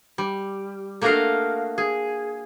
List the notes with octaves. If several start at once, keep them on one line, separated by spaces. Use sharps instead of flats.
G3
A3 A#3 D4 F#4 D#5 F5
G#4